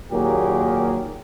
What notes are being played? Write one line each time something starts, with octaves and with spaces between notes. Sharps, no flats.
D#2 A#2 F#3 G4 G#4 A#4